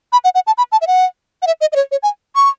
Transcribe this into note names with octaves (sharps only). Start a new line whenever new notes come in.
B5
F#5
F#5
A5
B5
A5
E5
F#5
F#5
E5
D#5
D#5
C#5
C#5
G#5
C#6